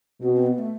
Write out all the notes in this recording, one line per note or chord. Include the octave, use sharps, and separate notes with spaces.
B2 C4
C4
B3
A3